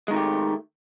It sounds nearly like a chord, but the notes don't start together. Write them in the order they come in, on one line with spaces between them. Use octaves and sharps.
G#3 D#3 A3 G4